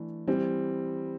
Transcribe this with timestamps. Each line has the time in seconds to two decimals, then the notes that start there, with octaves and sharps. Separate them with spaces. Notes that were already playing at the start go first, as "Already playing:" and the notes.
Already playing: E3 A3 D4
0.27 E3 G3 C4